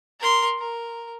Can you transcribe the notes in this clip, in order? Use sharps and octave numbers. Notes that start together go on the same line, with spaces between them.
A#4 C6
A#4